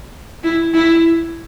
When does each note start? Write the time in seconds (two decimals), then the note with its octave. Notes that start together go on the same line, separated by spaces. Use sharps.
0.44 E4
0.74 E4